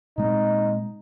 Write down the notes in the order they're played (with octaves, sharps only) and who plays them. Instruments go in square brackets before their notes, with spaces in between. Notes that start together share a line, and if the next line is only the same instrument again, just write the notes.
[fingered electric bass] A#2 G#3 C4 [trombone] D#4